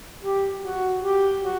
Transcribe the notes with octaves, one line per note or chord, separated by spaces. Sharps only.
G4
F#4
G4
F#4